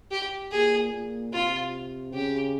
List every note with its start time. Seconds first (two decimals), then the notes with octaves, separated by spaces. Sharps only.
0.11 G4
0.51 A#2 G#4
0.92 A#2
1.33 C3 F4
2.13 C#3 G4